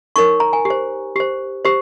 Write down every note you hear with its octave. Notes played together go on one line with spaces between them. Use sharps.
D#4 A#4 C#5 C#6
A#5
G#5
G4
C5
G4 C5
G4 C5